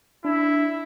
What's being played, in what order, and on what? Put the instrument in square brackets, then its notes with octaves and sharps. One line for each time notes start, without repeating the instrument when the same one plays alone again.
[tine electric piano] D4 [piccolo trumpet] E4